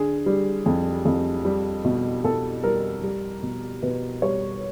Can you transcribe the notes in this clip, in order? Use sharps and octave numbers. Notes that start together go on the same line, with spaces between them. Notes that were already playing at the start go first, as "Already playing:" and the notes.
Already playing: D3 G#4
G3
F2
F2
G3
B2
B2 A4
G3 A#4
G3
B2
B2 B4
G3 C#5